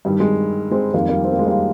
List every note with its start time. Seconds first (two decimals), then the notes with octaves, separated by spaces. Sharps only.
0.05 G2 D#3 G3
0.20 G#3
0.71 G#3 C4
0.94 F2 D#3 G3 A#3
1.09 G3 A#3
1.25 C4
1.32 A#3
1.39 G#3
1.46 G3 A#3